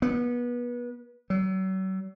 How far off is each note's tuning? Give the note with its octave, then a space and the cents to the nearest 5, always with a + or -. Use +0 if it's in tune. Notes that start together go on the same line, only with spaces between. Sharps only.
B3 -30
F#3 +40